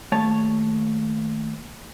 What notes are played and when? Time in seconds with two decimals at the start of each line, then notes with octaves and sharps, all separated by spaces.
0.12 D#2 A3 C#5 A5